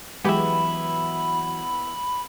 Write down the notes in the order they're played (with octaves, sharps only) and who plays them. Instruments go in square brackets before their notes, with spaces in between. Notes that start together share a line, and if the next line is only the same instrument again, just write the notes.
[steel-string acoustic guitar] E3 F#3 [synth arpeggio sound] G#3 G4 [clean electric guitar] B3 E4 [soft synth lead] B5